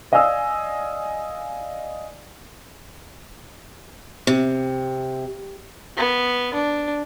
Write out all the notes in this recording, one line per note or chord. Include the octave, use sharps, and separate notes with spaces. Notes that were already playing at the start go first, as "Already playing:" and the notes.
D5 D#5 F5 G#5 D#6 E6
C3
B3
D4